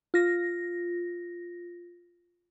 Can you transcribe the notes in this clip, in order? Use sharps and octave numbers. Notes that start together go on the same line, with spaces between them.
F4 A#6